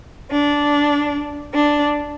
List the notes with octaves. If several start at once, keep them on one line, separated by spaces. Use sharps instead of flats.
D4
D4